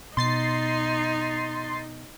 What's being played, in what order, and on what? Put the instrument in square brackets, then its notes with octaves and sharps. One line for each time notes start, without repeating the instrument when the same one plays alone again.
[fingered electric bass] B2 [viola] D#4 [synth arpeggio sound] C6 A6 C7